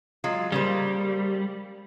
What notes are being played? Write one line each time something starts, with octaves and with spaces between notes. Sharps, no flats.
F#3 G#3 F4
C#3 G3 A#3 C5